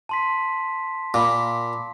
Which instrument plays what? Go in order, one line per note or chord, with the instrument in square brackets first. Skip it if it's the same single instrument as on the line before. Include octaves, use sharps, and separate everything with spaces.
[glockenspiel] A5 C6 B6
[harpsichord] A#2 [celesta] B5 D6